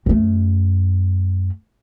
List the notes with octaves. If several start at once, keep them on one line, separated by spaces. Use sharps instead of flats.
F#2 A3